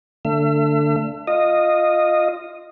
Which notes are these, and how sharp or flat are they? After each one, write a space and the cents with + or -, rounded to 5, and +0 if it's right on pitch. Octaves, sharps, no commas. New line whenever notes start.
D3 +0 A3 +20 E5 +40
F4 +0 D#5 -10